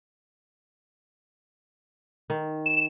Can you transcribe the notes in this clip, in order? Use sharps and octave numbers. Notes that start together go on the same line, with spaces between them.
D#3
E7